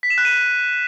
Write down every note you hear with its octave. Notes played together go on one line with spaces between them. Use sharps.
B6
E7
F#6
D#7